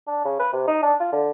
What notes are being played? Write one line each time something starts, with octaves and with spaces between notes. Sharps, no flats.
D4
C#3
B4
C3
D#4
D4
F4
D3